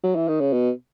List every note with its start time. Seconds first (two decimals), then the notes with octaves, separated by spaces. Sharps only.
0.03 F#3
0.16 E3
0.28 D#3
0.40 C#3
0.53 B2